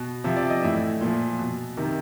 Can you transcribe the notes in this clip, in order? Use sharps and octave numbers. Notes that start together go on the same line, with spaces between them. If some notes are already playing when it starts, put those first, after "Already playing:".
Already playing: B2
C3 F3 E5
D5
D#5
A2 E3 E5
A#2 F3
B2
C3 D#3